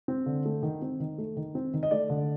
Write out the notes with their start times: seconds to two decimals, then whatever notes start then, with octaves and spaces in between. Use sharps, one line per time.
0.08 C4
0.26 D3
0.45 A3
0.63 D#3
0.82 C4
1.00 D#3
1.18 A3
1.37 D#3
1.55 C4
1.73 D#3
1.83 D#5
1.91 A3 D5
2.10 D3